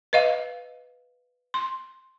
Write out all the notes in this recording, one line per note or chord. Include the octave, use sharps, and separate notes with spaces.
B4 D#5 F5
C6